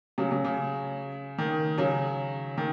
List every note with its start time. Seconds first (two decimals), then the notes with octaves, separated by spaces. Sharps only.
0.18 C#3 F#3
0.31 C#3 F#3
0.44 C#3
1.38 D#3
1.78 C#3 F#3
2.57 D#3